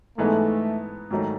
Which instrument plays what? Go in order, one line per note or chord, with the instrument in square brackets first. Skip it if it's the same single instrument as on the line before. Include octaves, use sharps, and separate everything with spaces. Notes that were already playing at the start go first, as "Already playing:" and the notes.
[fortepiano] G#2 E3 G#3 B3 D#4 [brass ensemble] A3
[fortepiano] G#2 D#3 F#3 A3 D#4